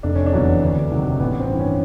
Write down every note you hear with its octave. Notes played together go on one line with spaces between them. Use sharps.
F1 D4
C#4
D4
E2 B2 F#3
D2
C3 D#3 F#3
A1 B3
C4
G2 E3
C#4